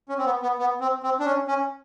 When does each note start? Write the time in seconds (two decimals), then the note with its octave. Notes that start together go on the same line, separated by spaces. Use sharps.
0.09 C#4
0.18 C4
0.26 B3
0.43 B3
0.59 B3
0.81 C4
1.03 C4
1.20 D4
1.26 C#4
1.47 C#4